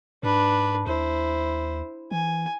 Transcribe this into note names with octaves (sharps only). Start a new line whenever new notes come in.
G#2 D4 B4
D#2 E4 C5
E3 G#5